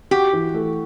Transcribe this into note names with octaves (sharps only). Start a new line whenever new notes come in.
F#4 G4
E3
A3